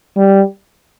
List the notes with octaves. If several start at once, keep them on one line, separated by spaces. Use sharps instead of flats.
G3